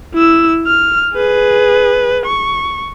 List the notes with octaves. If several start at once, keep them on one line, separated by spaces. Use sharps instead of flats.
E4 E6
F6
G#4 B4
C#6